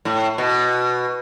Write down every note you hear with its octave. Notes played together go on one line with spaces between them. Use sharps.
A2
B2